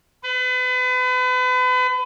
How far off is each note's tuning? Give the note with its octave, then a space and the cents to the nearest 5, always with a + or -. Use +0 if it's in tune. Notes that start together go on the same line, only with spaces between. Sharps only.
B4 +35